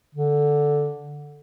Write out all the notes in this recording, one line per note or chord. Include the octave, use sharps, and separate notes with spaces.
D3